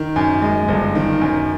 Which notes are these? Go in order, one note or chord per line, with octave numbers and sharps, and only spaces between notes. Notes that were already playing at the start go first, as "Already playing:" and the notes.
Already playing: D#3
F#2
G#3
G1
D#3
F#2